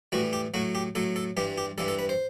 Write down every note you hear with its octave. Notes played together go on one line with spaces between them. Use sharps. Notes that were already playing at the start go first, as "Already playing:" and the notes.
A2 E3 G3 F#4
G4
A2 F#3 F#4
G4
A2 F#3 A4
A4
G2 E3 G3 G4
G4
G2 E3 G3 A4
A4
B4
C5